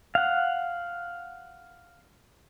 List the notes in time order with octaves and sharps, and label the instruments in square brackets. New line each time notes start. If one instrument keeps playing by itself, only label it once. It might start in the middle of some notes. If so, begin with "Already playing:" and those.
[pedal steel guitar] F5 F#5